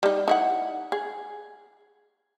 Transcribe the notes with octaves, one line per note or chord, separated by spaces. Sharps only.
G3 D#4
D#4 E4 F#5
G#4